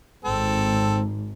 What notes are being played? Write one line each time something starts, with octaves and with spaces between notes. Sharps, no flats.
G#1 C4 A4